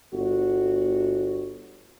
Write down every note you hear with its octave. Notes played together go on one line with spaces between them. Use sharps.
G1 F#4